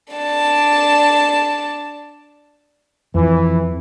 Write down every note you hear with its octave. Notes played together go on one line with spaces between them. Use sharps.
D4 A5
F2 E3